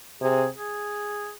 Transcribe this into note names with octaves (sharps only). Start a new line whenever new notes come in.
C3 G#4
G#4